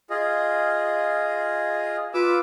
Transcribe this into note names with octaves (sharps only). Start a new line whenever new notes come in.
F4 G#4 D#5
F4 B4 D6 E6